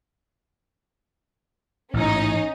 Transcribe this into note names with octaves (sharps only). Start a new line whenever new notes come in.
A1 G#2 C#4 D#4